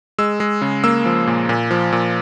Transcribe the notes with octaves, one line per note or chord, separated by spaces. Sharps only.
G#3 E6
G#3
C#3
A#3 E6
F3
A#2
A#2
F3
A#2